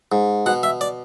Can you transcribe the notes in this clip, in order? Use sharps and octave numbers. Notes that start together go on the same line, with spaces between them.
G#2
B2 F#5
E5
D5